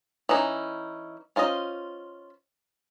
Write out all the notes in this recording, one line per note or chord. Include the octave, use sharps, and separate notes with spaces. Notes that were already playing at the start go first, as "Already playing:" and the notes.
E3 C#4 D#4
C#4 F4 C5 D#5